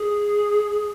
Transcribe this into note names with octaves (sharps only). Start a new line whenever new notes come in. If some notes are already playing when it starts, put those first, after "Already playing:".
Already playing: G#4